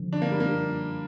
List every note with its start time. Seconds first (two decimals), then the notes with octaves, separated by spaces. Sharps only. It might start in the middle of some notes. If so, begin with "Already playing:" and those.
Already playing: D3 F3
0.13 D4
0.22 A#3
0.31 G3
0.40 A#3